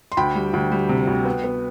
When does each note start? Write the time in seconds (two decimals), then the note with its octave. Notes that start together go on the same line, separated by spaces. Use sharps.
0.12 C6
0.17 D2 G5 B5
0.35 G3
0.53 D2
0.72 G3
0.89 C3
1.07 D2
1.25 B3
1.44 B3